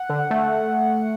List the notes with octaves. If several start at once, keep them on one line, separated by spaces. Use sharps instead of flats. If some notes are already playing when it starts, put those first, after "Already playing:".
Already playing: F#5
D3
A3